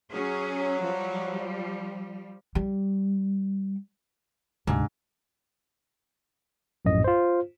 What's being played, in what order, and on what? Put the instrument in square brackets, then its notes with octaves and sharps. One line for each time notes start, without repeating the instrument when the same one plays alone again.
[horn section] F#3 [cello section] C#4 G#4
[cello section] F3 G3
[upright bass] G3
[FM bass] D2 [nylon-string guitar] G#2 [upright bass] C3 D4
[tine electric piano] A#1 F#2 A2 D#5
F4 C5